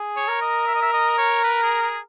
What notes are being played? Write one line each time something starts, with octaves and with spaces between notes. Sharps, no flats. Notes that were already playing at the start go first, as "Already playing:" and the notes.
Already playing: G#4
C#5
A#4
D#5
E5
D#5
E5
D#5
C#5
B4
G#4
G#4